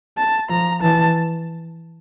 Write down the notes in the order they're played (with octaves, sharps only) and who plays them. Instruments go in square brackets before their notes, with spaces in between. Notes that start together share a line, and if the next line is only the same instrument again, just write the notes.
[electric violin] A5
[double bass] F3 [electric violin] A#5
[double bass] E3 [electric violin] A5